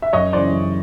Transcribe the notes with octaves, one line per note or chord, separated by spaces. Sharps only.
E5
F#2 C#5 D#5
C#3 E3 C5 D5
F#2